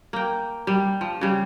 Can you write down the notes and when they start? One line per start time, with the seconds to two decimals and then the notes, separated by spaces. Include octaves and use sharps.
0.13 A#3 G5
0.67 G3
1.01 F3
1.21 C#3 G3